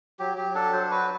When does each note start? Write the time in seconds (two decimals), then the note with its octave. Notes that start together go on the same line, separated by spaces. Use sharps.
0.19 F#3 G4
0.37 F#3 G4
0.55 D4 A4
0.73 F#3 C5
0.91 F#4 B4